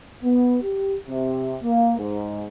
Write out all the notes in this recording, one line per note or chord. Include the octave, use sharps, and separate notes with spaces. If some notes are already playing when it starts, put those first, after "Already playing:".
B3
G4
C3
A#3
G#2